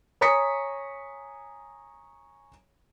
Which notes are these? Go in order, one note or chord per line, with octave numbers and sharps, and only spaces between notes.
C#5 G#5 A#5 D#6 B6 C#7